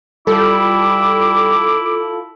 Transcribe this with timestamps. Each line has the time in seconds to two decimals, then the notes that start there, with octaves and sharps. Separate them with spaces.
0.27 G3 E4 F4 A4 D6